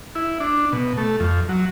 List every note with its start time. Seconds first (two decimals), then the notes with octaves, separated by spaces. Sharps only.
0.15 E4
0.40 D4
0.73 B2
0.97 A3
1.20 F2
1.49 F#3